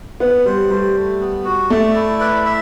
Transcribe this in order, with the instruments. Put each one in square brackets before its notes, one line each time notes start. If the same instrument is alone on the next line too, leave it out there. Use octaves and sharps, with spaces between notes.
[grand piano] B3 [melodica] F#5
[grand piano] G3 [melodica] C5
[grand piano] G3 [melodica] A3
[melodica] A3
B3
F#4
[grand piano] A3 [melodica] D5
[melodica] E4
B4
E5